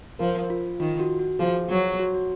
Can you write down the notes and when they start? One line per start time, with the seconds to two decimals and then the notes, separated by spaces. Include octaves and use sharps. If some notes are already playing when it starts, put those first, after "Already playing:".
0.19 F3 A#4
0.50 F4
0.80 D#3 F4
1.00 F#4
1.19 F#4
1.39 F3 G#4
1.69 F#3
1.99 F#4
2.14 F#4